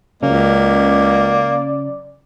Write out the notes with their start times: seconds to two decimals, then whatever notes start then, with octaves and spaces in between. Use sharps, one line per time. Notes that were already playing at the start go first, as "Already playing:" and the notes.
0.22 C#2 C#3 F#3 A#3 C#4 D5